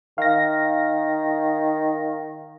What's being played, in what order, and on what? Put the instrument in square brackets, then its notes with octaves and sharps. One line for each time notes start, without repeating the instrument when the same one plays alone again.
[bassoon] D#3 [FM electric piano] F5 A#6